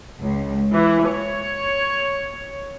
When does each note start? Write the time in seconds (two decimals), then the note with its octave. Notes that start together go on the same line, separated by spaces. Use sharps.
0.20 C#2
0.72 E3
1.07 C#5